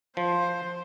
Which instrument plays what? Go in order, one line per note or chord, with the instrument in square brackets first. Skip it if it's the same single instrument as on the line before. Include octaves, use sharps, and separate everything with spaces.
[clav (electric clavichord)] F3 [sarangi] C5